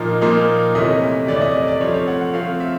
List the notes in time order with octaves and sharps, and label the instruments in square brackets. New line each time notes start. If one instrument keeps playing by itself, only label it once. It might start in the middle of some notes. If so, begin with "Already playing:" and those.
Already playing: [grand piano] A#2 F3 A#3 D#4
A#2 F3 A#3 D#4
C3 E3 A3 C#4 E4 D#5
C3 E3 A3 C#4 E4 D5
D#5
D5
D5
F3 A3 C4 C#5
C#5
F#5
F#5
F3 A3 C4 F5
E5